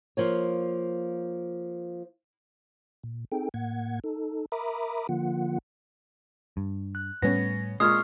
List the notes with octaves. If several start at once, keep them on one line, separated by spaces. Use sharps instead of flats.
F3 A#3 C#5
A#2
C4 D#4 G#4 A4 G5
A2 A#3 F#5 G#6
D#4 A4
A#4 E5 A#5 B5 D6 D#6
D3 F3 A#3 F4 F#5
G2
F#6
A2 G3 A3 B3 C#4 A#6
A#2 G#3 C#6 D#6 F6 C7